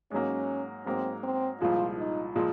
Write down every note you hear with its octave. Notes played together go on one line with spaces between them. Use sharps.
G#2 F#3 A#3 C#4
G#2 F#3 A#3 C4
C4
C2 A#2 F3 G#3 F4
D#4
A#2 F3 G#3